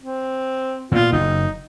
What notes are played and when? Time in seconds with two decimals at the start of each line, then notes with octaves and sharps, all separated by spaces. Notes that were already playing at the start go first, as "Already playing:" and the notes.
0.03 C4
0.92 A#2 B3 F4
1.12 F#1 D#4